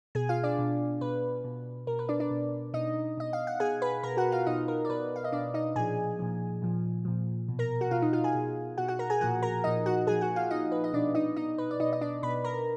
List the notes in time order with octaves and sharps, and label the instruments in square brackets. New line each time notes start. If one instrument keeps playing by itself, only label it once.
[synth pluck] B2 G#4 G#5
F4 F5
D4 D5
B2
B2 B4
B2
B2 A#4
B4
D4 D5
D4 D5
B2
B2 D#4 D#5
B2 D#5
F5
F#5
B2 G#4 G#5
B4 B5
B2 A#4 A#5
F#4 F#5
F4 F5
B2 D#4 D#5
A#4
D5
B2 B4
F5
D#5
B2 D4 D5
D#4 D#5
A#2 F3 G#4 G#5
A#2 F3
A#2 F3
A#2 F3
B2
A#4 A#5
F#4 F#5
B2 F4 F5
D#4 D#5
F4 F5
G#4 G#5
B2
B2 F#4 F#5
F#4 F#5
A#4 A#5
G#4 G#5
A#2 F3 F#4 F#5
A#4 A#5
A#2 F3 D#4 D#5
F#4 F#5
A#2 G#4 G#5
F3
F#4 F#5
F4 F5
F3 D#4 D#5
A#2
B4
D#5
B2 D4 D5
D#4 D#5
B2 D#4 D#5
B4
D5
B2 D#4 D#5
D#5
D4 D5
B2 B4 B5
A#4 A#5